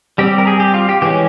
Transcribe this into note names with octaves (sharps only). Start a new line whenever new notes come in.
G3 C4 G4
A#4
G#4
G4
F4
G4
E3 G#3 C#4 G4